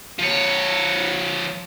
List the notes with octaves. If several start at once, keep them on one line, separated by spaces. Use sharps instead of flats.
F3 C#5